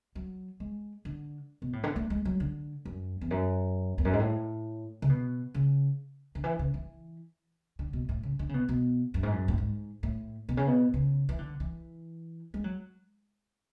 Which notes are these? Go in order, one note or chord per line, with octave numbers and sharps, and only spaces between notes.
F#3
G#3
D3
B2
A2
D3
A3
G#3
F#3
D3
F#2
E2
F#2
E2
F#2
G#2
A2
C#3
B2
C#3
D3
E3
C#3
E3
D3
B2
A2
C#3
D3
C#3
B2
B2
F#2
G#2
F#2
A2
G#2
A2
B2
C#3
B2
C#3
E3
D3
E3
G#3
F#3